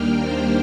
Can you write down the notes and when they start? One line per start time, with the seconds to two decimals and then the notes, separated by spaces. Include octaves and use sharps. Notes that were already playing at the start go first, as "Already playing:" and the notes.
Already playing: D#2 D#3 G3 A#3 D4 G5 F6
0.20 C5